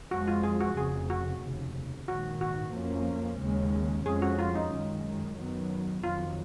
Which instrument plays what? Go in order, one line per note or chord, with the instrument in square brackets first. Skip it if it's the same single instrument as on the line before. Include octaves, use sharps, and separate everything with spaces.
[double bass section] F2 F3 G#3 [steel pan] F#4
[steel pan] F4
G#4
F#4
[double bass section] F1 F2 C#3 [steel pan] G#4
[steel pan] F#4
[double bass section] F1 D#2 C#3
[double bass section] A#1 G#2 D#3 [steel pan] F#4
[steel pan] F#4
[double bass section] F2 F3 A#3 C#4
D#2 C#3 G#3 C#4
[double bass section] F2 F3 G#3 C#4 [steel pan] G#4
[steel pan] F#4
F4
D#4
[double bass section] F#2 D#3 G#3
F#2 D#3 F#3 B3
[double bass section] F2 D#3 F#3 [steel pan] F4